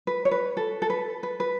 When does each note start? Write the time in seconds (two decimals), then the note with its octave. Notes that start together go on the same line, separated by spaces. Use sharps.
0.07 B4
0.25 C#5
0.31 B4
0.57 A4
0.82 A4
0.90 B4
1.23 B4
1.40 B4